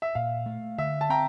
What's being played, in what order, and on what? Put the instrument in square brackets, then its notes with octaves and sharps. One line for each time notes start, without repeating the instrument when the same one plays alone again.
[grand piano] E5
[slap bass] A#2 [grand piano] F5
[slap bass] A3
[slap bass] D3 [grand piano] E5
[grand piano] A5
[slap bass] C4 [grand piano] G5 A#5